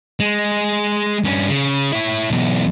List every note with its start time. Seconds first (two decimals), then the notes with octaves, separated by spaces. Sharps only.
0.20 G#3
1.24 G2 C#4
1.49 C#3
1.92 E4 C#5
2.30 B1 E2